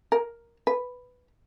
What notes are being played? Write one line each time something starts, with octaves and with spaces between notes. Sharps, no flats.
A#4
B4